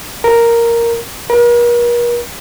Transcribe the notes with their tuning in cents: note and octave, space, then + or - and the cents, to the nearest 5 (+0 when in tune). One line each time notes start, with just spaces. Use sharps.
A#4 +0
A#4 +45